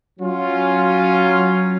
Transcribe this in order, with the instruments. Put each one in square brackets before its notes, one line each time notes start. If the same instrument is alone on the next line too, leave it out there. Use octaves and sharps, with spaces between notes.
[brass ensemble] F#3 C#4 F4